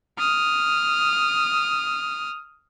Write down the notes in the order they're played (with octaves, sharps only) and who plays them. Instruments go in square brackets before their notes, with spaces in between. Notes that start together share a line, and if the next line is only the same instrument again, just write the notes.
[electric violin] D#6 F6